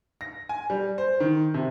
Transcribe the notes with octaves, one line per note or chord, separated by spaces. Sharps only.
A#6
G#5
G3
C5
D#3
C3